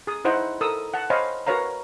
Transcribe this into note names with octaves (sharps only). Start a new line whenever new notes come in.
G#4 D#6
D#4 E4 C5 D#5 F#5
A4 A#4 D#6 E6
F#5 A5
C5 C#5 D#5 F5 G#5 B5
F#4 A#4 B4 C#5 F5 A#5